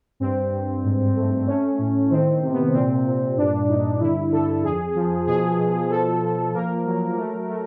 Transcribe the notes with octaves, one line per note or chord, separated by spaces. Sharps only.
G2 C4
G2
G#2
A3
A3 C#4
A2
D#3 C4
C3
B3
A#2 C4
A#2
G2 D4
G2 D#4
D3 E4
D3 A4
F2 G#4
F3
B2 G#4
B2
F3 A4
F3
A#3 A#4
F#3
A3
A3